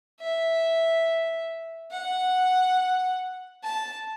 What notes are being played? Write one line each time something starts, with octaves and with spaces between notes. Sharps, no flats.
E5
F#5
A5